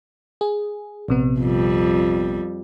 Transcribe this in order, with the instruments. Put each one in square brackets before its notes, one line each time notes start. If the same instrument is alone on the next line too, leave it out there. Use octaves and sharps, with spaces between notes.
[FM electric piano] G#4
A#1 C3 B3
[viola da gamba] F2 G3